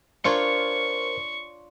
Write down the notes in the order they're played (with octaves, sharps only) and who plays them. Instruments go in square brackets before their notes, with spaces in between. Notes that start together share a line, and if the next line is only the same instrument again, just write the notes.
[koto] D4 F4 C#5 [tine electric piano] A#4 C5 C#7 [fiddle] C#6